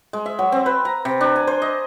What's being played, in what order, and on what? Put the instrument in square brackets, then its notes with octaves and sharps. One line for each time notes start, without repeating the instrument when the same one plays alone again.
[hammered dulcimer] G#3
E5
F#3
C4
B4
A#5
C3
D4
G#5
C5
D#5